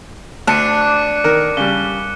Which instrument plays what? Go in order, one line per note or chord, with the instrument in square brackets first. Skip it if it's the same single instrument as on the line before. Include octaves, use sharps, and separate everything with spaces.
[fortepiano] D2 [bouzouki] D4 [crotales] F#6 C#7 D#7
[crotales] D6
[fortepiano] D#3 A#4
[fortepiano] C#3 G3 [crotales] G7